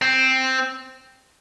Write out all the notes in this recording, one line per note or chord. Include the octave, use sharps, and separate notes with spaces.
C4